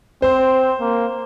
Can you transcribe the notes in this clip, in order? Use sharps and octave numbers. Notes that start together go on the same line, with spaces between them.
C4 C5
A#3